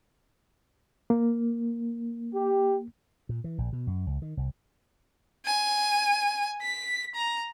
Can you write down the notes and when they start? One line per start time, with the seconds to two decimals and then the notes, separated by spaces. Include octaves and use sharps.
1.10 A#3
2.33 G4
3.29 A#2
3.44 E3
3.58 A#1
3.73 B2
3.87 F#2
4.07 C#2
4.22 D#3
4.37 C2
5.46 G#5
6.62 B6
7.15 A#5